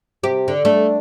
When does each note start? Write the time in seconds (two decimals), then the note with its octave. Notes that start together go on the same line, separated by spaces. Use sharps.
0.23 C3 G4
0.48 D3
0.65 A3 D4